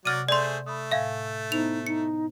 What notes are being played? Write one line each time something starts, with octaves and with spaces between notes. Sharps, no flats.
C3 F#3 D5 F#5 F6 D#7
A3 G#4 C5 D5 C6
A3 B5 D#6
A2 E5 F5 G#5 G#6
B3 D#4 E4 C5 F7
D#4 C#7